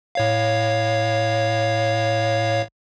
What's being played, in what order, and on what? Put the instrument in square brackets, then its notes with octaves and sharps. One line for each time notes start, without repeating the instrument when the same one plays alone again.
[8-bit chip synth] A2 C#5 F5